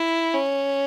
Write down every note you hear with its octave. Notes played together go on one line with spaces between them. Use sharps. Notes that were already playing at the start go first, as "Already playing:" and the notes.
Already playing: E4
C#4